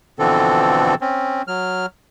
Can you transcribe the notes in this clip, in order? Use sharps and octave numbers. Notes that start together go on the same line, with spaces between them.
B2 D3 E3 F3 C4 A4
C4 C#4
F#3 F6